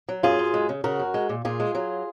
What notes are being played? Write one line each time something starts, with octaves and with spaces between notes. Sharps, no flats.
F#3
F#2 F4 G#4
F#2
G#3
C#3
C#3 F#4 A#4
F#2
G#3
A#2
A#2 F4 G#4
G#3
F#3